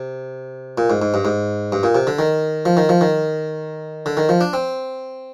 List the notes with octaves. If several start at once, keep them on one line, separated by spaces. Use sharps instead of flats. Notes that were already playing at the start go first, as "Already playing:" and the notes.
Already playing: C3
A#2
G#2
G#2
G2
G#2
G2
A#2
C3
D3
D#3
F3
D#3
F3
D#3
D3
D#3
F3
D4
C4